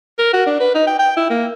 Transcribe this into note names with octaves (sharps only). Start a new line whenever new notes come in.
A#4
F#4
D4
B4
D#4
G5
G5
E4
A#3